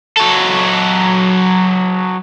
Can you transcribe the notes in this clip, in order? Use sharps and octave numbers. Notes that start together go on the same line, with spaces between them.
F#3 A4